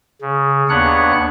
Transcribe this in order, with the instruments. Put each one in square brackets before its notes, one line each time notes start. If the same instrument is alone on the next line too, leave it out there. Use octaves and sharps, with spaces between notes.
[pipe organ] C#3
D#2 B3 D4 C#5 F#5 F#6